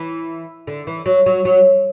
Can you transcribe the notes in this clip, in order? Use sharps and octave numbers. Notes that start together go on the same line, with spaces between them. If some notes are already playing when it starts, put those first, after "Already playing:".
Already playing: E3
D3
E3
F#3
F#3
F#3